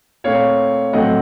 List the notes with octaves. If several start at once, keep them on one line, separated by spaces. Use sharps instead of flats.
A#2 A3 C4 C#5 F5
A2 F#3 A3 C4 D#5 F#5